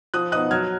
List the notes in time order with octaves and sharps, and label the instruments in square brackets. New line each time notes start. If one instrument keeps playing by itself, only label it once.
[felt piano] F3 D#6 F#6
B3 D#4 D#6 F#6
F#3 F6 G#6